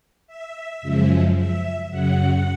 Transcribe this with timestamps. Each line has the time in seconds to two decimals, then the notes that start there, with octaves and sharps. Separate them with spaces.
0.27 E5
0.82 F#2 C#3 F3 G#3
1.36 E5
1.90 F#2 C#3 F#3 F#5